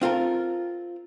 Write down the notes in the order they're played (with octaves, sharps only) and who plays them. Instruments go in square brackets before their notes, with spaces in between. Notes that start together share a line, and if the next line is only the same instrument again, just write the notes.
[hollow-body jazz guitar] C4 F4 A4 A#4